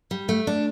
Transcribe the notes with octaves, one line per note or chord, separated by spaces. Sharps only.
G3
A3
D4